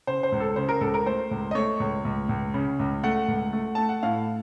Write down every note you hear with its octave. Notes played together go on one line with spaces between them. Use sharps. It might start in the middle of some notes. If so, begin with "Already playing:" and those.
C#3 C5
C5
C#2
A4
C#3 C5
A#4
C#2 A4
A#4
A3 C5
C#2
D#5
A3 C#5
C#2
C#2
C#2
C#3
C#2
A3 F#5
C#2
A3
A3 A5
F#5
A2 F5